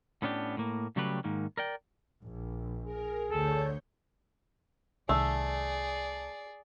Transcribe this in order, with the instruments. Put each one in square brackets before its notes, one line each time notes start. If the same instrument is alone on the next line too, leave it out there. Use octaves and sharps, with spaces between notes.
[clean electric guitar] A2 B3 C#4 D4 G4
A2 A#3
C#3 F#3 G3 A3 G4 B4
G#2 D#3 A#3
A#4 D5 G5
[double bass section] A#1
[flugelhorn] G#4 [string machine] A#4
[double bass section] D2 [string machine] D3 C#5 G6 [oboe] A4
[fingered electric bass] C2 D#3 [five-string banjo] A3 [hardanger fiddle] G#4 D5